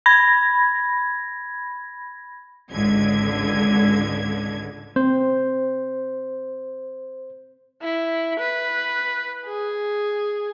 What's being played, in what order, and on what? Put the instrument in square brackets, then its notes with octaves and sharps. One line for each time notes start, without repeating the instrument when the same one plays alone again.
[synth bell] B5 G#6 A#6
[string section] G#1 C#2 D3 G#6
[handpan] C4 [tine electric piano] C5
[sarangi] E4
B4
G#4